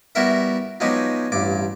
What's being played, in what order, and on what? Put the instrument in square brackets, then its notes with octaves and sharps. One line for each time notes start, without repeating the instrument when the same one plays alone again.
[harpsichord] G3 B3 E4 F#4 A#4 E5
F3 F#3 G#3 B3 D#4 G4
A1 G2 D6